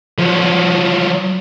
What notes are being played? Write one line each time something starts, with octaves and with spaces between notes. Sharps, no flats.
F3 F#3